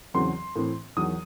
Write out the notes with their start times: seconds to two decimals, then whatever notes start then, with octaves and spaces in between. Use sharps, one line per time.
0.14 E2 C#3 F#3 C4 C6
0.56 A2 E3 C4
0.97 E2 D#3 F#3 D#6